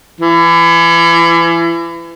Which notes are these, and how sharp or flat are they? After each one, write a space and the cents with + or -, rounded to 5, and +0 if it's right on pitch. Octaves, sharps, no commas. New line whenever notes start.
E3 +30